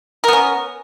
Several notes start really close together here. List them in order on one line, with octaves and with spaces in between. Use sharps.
A#4 B3 C#4